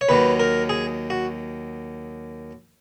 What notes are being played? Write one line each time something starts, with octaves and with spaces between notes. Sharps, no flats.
C#5
D#2 D#3 F#3 B4
A#4
G#4
F#4